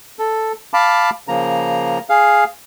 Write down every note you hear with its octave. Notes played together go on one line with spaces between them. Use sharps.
A4
F5 A5 B5 D6
C#3 F3 A#3 A#5
G#4 F5